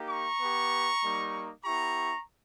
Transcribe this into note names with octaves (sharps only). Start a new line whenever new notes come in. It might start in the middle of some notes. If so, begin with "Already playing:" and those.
Already playing: A#3 D#4 G4
A#5 C#6
B3 G4
G3 A#3 D#4
B3 E4 G4 A#5 C#6